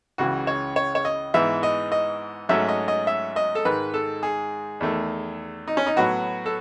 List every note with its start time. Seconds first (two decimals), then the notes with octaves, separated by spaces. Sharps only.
0.18 C#2 C#3 E3 F#4
0.47 C#5
0.76 C#5
0.95 C#5
1.05 D#5
1.34 G#2 E3 B3 E5
1.63 D#5
1.92 D#5
2.49 G#2 F#3 A3 C#4 E5
2.68 D#5
2.88 D#5
3.07 E5
3.36 D#5
3.55 A4
3.65 G#2 D#3 G#3 B4
3.94 A4
4.23 G#4
4.81 E2 D#3 A3
5.68 D#4
5.77 C#4
5.86 D#4
5.96 A2 F#3 B3 F#4
6.46 A4